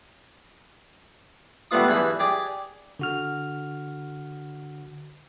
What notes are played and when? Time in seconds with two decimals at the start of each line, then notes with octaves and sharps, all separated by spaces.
1.71 G2 G3 A3 B3 F4 D#6
1.88 G2 E3 G#4 B5
2.19 G4 G#4 D5
2.99 D3 F#4 F6